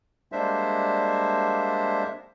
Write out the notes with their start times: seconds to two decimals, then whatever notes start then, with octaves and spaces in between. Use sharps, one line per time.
0.32 G3 G#3 A#3 D4 C5 E5